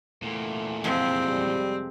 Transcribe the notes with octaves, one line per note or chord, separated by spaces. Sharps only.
E2 A#2 A3
F2 C3 G#3 C4
G3